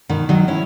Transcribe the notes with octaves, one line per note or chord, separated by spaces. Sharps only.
B2 D#3
D#3 F#3
C#4 E4